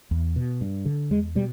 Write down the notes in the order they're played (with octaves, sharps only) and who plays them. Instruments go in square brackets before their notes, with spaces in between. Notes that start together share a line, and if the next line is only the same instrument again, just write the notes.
[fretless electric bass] E2
B2
G2
D3
E2 G#3
B2 G3